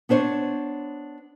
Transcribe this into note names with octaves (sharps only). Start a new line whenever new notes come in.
B3 D4 C5 C#5